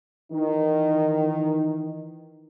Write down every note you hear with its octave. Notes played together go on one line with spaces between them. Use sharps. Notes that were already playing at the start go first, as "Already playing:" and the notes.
D#3 E3 D#4